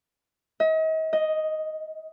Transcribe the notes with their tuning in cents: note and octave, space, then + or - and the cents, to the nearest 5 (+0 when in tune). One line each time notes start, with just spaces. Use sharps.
D#5 +40
D#5 +5